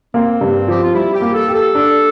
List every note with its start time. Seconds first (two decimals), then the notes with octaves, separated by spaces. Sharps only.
0.14 A#3 C4
0.41 G2
0.68 F3 G4
0.82 F4
0.94 G3 E4
1.14 G4
1.22 A#3
1.34 A4
1.48 G4
1.54 A4
1.75 D4